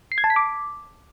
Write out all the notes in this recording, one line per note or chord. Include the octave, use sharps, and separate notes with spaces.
C7
G#6
A5
B6
D6